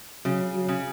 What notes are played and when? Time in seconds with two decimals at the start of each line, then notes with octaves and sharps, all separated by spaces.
0.25 C#3 F#3
0.54 F#3
0.69 C#3